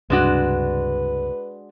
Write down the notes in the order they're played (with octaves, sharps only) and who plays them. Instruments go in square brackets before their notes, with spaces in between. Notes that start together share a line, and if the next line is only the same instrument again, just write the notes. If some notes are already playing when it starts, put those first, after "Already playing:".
[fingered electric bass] C#2 G2 C3 [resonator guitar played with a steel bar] G#3 D4 F#4 [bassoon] B4